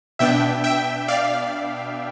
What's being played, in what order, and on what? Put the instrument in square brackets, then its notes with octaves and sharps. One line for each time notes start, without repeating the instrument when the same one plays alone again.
[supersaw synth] B2 B3 D4 E5 G5
E5 G5
D5 F5